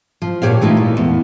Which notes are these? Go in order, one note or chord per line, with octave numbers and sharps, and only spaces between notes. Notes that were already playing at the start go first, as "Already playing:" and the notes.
F3
A#2 G4 C#5 F5
E3 A3 D#4 F4 G4
A#2
E2